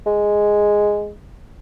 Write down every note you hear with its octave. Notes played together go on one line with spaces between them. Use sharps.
G#3